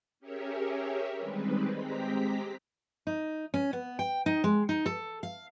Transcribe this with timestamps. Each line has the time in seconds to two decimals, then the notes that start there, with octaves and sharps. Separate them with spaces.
0.20 C#4 G4 G#4 A#4 C#5 E5
1.18 D#3 G3 G#3 C4 B4
1.75 G#3 C4 G4 A#5 B6
3.07 D#4
3.54 C#4
3.73 B3
3.99 G5
4.26 D#4
4.44 G#3
4.69 D#4
4.86 A4
5.23 F5